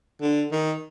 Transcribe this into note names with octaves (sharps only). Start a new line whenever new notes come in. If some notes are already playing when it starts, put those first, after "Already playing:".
D3
D#3